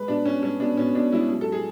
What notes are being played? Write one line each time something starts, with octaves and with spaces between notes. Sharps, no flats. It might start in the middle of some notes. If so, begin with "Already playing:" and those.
Already playing: G#3 B4
B2 D4
B2 C#4
G#3 C#4
B2 D4
B2 C#4
B2 D4
G#3 E4
F#3
A4
F#3
G#4